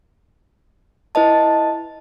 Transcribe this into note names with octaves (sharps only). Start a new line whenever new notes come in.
E4 B4 D#5 A5